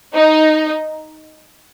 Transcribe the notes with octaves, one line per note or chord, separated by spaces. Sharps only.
D#4